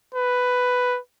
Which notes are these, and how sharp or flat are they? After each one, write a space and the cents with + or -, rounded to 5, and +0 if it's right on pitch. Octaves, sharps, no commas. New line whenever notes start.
B4 +5